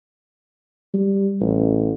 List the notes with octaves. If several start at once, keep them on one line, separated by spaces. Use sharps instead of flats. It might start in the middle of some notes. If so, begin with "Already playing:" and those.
G3
A1